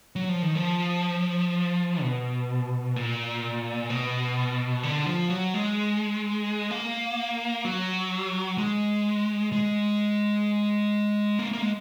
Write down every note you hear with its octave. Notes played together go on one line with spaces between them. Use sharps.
F#3
F3
D#3
F3
B2
A#2
B2
D3
F3
F#3
G#3
A#3
F#3
G#3
G#3
A#3
A#3
G#3